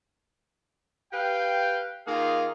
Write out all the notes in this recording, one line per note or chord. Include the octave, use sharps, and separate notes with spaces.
G4 B4 F5 G5
D#3 A#3 D#4 F4 G#4 F5